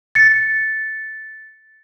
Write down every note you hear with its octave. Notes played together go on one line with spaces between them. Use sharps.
A6 C#7